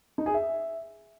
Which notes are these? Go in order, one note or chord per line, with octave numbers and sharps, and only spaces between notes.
D#4
G#4
E5